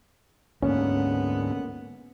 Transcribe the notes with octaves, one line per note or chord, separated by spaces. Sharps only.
D2 G#2 A#3 B3 C#4 F#5